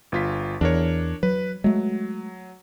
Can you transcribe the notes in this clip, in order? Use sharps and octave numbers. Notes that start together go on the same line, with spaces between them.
G1 F4 B6
E2 D4 A#4 C#5
F#3 B4
F#3 G#3 A3